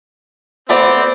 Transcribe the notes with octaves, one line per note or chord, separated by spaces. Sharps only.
A3 B3 C4 D5